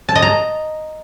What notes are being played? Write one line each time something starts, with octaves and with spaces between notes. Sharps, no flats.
A5
D#5
A#5